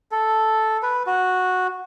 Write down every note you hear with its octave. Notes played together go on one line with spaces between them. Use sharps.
A4
B4
F#4